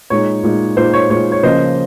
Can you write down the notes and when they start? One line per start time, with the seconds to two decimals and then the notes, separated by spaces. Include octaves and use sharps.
0.10 A#2 G#3 D#4 C#5
0.43 A#2 G#3 D#4
0.77 A#2 G#3 D#4 C5
0.94 C#5
1.10 A#2 G#3 D#4 C#5
1.32 C#5
1.43 C#3 F3 A#3 C#4 C5 D#5